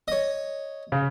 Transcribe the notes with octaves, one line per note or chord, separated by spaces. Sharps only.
C#5 D#5
C#3